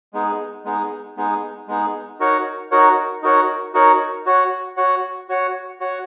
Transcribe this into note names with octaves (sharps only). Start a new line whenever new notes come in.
G#3 B3 D#4 G#4
G#3 B3 D#4 G#4
G#3 B3 D#4 G#4
G#3 B3 D#4 G#4
D#4 F#4 A#4 C#5 F#5
D#4 F#4 A#4 C#5 F#5
D#4 F#4 A#4 C#5 F#5
D#4 F#4 A#4 C#5 F#5
F#4 C#5 F#5
F#4 C#5 F#5
F#4 C#5 F#5
F#4 C#5 F#5